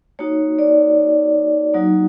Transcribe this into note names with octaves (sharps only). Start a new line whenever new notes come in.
A#3 D#4 F#4 C#5
D5
F#3 A#3 D#4 F#4